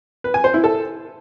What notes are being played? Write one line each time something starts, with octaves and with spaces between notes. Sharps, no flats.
B4
G#5
C5
E4
A4